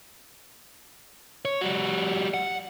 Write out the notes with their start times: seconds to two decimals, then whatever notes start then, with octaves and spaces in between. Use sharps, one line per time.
1.45 C#5
1.61 G3 F#4
2.34 F#5